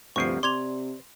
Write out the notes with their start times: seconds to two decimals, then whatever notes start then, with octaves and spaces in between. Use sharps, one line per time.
0.16 G1 D2 C3 F3 C#6 C7
0.43 C3 D5 C6 G#6 F7